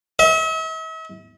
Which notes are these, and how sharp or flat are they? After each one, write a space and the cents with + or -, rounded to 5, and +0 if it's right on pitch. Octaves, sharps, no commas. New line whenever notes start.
E5 -45